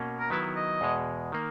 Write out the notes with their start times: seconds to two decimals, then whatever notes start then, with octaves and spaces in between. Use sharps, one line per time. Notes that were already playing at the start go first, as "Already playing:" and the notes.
Already playing: B2 A#3 C#4
0.20 A#4
0.30 D#3 F#3 B3 E4 B4
0.56 D#5
0.81 E2 B2 G#3
1.32 D#3 A#3